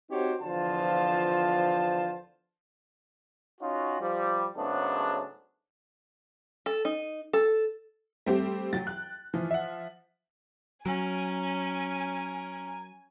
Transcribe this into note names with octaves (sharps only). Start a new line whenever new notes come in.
C4 D#4 F#4 G4 C5 C#5
E2 D3 F3 F4 C5 A5
C#4 D#4 F4 F#4
F3 G3
G#2 C#3 F#3 A3 B3 D4
A4
D#4
A4
G3 A3 C4 G4
F#3 G5 A6
F#6
E3 F3
E5 F#5
F#3 C#4 A#4 G#5